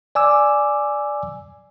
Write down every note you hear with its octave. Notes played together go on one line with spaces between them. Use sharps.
D5 G#5 D6 E6